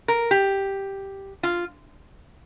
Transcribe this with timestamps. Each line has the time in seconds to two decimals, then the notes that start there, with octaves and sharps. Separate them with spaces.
0.08 A#4
0.31 G4
1.43 F4